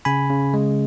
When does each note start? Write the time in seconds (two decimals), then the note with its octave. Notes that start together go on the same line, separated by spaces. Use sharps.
0.05 C#3 G#5 B5
0.30 C#3
0.54 G#3